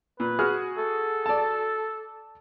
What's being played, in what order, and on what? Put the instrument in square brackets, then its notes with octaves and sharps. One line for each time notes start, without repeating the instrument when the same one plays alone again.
[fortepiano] A#2 [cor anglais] B4
[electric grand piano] F#4 G#4 [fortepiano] F6
[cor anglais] A4
[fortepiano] D5 A5